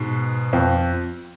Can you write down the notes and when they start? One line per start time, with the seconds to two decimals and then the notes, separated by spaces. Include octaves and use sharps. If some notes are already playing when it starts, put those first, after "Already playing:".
Already playing: G#2 B2
0.53 F2